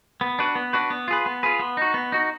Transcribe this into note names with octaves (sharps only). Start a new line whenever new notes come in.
B3
D4 F#4 B4
B3
D4 F#4 B4
B3
F4 G#4 B4
B3
F4 G#4 B4
B3
D#4 F#4
B3
D#4 F#4